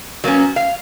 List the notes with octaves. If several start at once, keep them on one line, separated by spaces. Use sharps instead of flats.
F#3 A#3 B3 C#4
F5